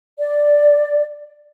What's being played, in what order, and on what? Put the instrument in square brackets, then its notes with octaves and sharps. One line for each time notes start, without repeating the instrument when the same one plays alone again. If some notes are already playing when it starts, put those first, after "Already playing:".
[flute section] D5